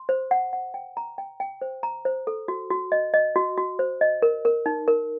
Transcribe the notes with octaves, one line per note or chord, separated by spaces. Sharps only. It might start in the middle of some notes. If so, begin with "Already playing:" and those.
Already playing: C6
C5
F#5
F#5
G5
A#5
G5
G5
C5
A#5
C5
A4
F#4
F#4
D#5
D#5
F#4
F#4
C5
D#5
A#4
A#4
D#4
A#4